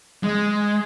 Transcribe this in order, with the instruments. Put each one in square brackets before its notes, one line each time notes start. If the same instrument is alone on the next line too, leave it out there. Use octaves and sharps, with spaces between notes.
[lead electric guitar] G#3